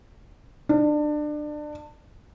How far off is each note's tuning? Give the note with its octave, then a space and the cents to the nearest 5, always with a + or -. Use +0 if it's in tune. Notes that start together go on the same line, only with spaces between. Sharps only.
D4 +25